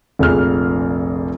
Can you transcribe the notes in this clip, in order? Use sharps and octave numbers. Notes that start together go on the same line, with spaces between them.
F1 A#1 G#4 F6